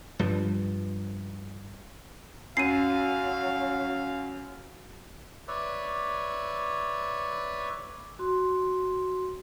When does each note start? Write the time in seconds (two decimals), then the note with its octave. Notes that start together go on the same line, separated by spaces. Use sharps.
0.19 G2 F3
2.57 F#2 F#3 F5 C7 D#7
5.48 B4 C#5 D5 E5
8.19 F#4 C6